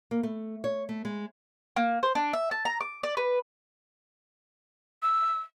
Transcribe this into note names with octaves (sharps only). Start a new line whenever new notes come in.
A#3
A3
C#5
A3
G#3
A#3
C5
D4
E5
A5
A#5
D6
D5
B4
E6